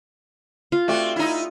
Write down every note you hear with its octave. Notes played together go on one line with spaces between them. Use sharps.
F4
A3 C4 D4 F#4 G4
D#4 E4